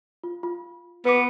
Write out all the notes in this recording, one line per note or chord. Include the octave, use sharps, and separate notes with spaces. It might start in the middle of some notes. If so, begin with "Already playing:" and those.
F4
F4
B3 B4 D6